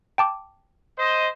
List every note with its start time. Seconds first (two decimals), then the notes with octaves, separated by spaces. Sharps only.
0.18 G5 A5 D6
0.98 C5 D#5